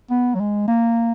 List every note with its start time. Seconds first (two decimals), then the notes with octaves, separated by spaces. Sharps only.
0.11 B3
0.35 F#3
0.40 G#3
0.68 A#3